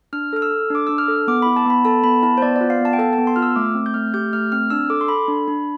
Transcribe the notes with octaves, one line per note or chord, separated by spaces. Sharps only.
D4 F6
A4 F6
E6
A4
D4 D6
D4 E6
F6
A4
B3 D6
E4 B5
A5
B3 B5
A4 A5
B3 B5
E4 A5
C5
B3 D5
F4 D5
F5
B3 A5
G5
A4 A5
B3 A5
C6
F4 F6
E6
A3 D6
C4
G6
A3 F6
G4 G6
A3 F6
C4 F6
D4 E6
A4 D6
C6
A4 B5
D4
D4